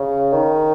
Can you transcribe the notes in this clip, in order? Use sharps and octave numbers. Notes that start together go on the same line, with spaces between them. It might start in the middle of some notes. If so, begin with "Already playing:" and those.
Already playing: C#3
D#3